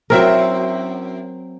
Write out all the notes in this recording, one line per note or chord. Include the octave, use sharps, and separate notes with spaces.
F#2 F#3 C4 E4 A#4 E5